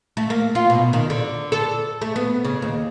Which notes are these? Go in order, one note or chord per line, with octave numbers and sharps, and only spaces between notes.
A3
A#3
F4
B2
D#3
D3
A4
A3
B3
C#3
D#2